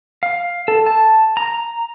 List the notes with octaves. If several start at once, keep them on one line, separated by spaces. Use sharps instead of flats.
F5
A4
A5
A#5